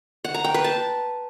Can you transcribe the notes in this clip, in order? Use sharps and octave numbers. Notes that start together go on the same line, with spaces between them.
F#5
A#5
G5
B4
A5